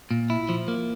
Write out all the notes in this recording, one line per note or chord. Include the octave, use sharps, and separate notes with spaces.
A#2
E4
F3
A#3